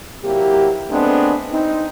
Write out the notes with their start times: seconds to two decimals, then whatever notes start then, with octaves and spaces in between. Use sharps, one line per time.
0.25 C3 F#3 A#3 E4 G4
0.90 F2 G#3 A3 B3 C4 D4
1.52 C4 D#4